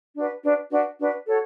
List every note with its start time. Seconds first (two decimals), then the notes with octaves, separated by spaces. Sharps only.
0.16 D4 F#4 B4
0.43 D4 F#4 B4
0.71 D4 F#4 B4
0.99 D4 F#4 B4
1.27 F#4 A4 C#5